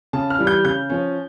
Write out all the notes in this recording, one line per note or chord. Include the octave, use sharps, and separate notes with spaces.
C#3 A5
F6
E3 G3
G6
C#3 G6
F3 C#4